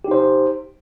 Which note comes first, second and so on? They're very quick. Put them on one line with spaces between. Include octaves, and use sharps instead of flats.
G4 D#4 C5